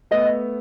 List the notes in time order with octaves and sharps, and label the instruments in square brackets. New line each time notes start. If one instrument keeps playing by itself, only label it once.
[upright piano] A3 B3 [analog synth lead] D#5